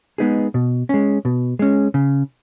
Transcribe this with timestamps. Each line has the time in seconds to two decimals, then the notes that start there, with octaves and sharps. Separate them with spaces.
0.18 G#3 B3 D#4 G#4
0.54 B2
0.89 G#3 C#4
1.25 B2
1.59 G#3 C#4
1.94 C#3